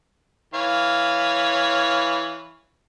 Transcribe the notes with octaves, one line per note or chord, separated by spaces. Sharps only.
E3 C#5 F5